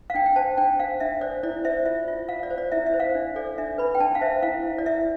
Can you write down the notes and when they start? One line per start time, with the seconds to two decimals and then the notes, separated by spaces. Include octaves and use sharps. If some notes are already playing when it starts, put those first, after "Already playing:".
0.10 F5
0.15 D4 G5
0.26 G5
0.36 C5 A5
0.57 D4 G5
0.80 C5 F5
1.00 D4 E5
1.21 C5 D5
1.43 E4 D5
1.64 C5 E5
1.86 F4 E5
2.08 F4
2.28 F4 F5
2.43 D5
2.50 C5
2.58 D5
2.72 E4 E5
2.86 E5
2.94 C5
3.00 F5
3.15 D4
3.36 A4 D5
3.58 D4 E5
3.78 B4 B5
3.95 G5
4.00 D4 A5
4.15 F5
4.21 C5 E5
4.43 E4 F5
4.64 E4
4.78 D5
4.85 E4 E5